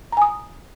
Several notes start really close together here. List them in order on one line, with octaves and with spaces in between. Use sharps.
A#5 G#5 D#6